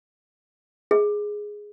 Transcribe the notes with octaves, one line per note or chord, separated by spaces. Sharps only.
G#4